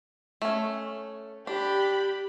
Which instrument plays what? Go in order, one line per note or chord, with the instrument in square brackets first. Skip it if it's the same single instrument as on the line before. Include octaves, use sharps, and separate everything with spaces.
[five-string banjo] A3 C#4
[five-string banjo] D4 [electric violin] G4 B5